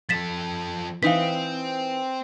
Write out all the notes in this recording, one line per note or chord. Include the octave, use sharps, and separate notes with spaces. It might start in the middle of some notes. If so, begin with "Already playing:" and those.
F3 A4 A6 B6 E7
E3 C4 D#4 B4 F5 B6